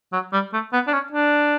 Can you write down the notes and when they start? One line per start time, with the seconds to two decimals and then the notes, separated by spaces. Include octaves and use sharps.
0.13 F#3
0.33 G3
0.53 A3
0.73 B3
0.87 D4
0.93 C#4
1.12 D4